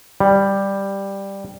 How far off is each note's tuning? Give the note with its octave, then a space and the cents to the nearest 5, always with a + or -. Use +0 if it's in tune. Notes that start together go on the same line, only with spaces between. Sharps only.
G3 +5